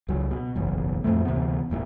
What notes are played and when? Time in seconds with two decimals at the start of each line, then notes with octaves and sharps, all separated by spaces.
0.08 C#2 F#3
0.31 B2
0.55 F#1 B1 E2
1.04 F2 A2 F3 A3
1.25 D2 C3 E3 B3
1.70 E1 A1 A#2 E3